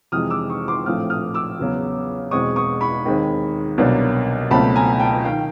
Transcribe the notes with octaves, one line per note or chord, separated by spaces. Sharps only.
F2 C3 E3 G#3 D#6 F6
D6 E6
C#6 D#6
C6 D6
A#1 A2 F3 A3 C4 D#6 F6
D#6 F6
D6 E6
E2 C#3 F#3 B3
E2 B2 G#3 C4 C#6 D#6
C#6 D#6
B5 C#6
D#2 D#3 G#3 C4
C2 B2 F#3 A#3 D4
C#2 B2 F#3 A3 C4 A5 B5
G#5 A#5
G5 A5
D#3 F5 G5